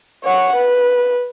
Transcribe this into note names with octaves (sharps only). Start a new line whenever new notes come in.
C#5 F#5
B4